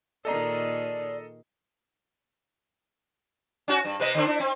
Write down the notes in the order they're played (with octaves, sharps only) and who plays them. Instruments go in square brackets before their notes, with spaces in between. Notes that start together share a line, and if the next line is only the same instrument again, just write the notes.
[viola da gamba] A#2 D#3 G#4 [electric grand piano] A4 D#5 A#5 [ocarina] D5
[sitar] C#4 F#4
G2
C3 B4 D#5
D3 C4 D4
D4 E4
C4